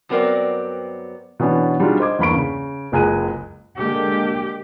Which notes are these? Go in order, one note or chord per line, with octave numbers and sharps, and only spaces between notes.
G2 F#3 B3 C4 A#4 D5
B2 E3 B3 C#4 D4
G3 D4 D#4 F4 F#4 G#4
C5 D#5 D6 G#6
E2 G2 A#3 B5 C#6 D7
C#3
F#1 C#2 G#3 G#5 F#6 D#7
D3 G#3 A#3 G4